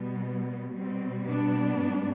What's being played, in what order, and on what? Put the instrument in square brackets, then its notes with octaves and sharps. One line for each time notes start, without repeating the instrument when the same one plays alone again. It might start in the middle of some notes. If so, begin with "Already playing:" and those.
Already playing: [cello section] B2 G3 B3
B2 G3 C4
B3 D4
G#2 G3